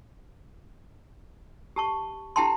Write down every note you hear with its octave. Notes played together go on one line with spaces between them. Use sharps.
G4 A5 C#6
E4 G4 G5 A5 C6